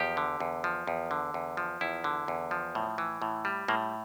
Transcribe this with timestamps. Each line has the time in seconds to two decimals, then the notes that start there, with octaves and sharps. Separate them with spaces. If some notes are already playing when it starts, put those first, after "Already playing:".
Already playing: E2 F3 G4
0.17 D3
0.40 E2
0.64 F3
0.87 E2
1.11 D3
1.34 E2
1.57 F3
1.81 E2 E4
2.04 D3
2.28 E2
2.51 F3
2.75 A2
2.98 E3
3.22 A2
3.45 G3
3.68 A2 A#3